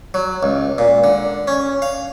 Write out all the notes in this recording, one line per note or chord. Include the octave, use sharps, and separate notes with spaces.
F#3
C#2
A#2
D3
C#4
F5